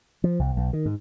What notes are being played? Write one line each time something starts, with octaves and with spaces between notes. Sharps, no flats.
F3
C2
B1
D#3
G#2